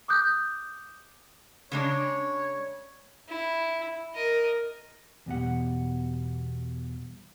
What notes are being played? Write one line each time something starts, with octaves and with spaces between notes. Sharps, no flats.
D6 D#6 F#6 G6
C#3 G#3 D4 C#5
E4
A#4 D#5
E2 B2 G3 F#5